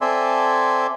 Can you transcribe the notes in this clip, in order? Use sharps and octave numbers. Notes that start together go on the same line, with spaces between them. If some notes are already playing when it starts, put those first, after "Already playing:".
C4 A4 D5 E5 G#5 C6